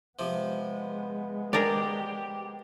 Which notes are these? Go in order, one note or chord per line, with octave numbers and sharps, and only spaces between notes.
C3 F3 G#3 B3
G4 G#4 A#4 D5